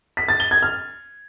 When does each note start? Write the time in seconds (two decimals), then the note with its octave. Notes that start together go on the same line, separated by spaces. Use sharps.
0.17 B6
0.28 A6
0.40 G7
0.51 G#6
0.63 F6